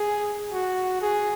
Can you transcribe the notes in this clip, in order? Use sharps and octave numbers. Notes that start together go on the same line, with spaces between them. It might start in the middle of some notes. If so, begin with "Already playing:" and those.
Already playing: G#4
F#4
G#4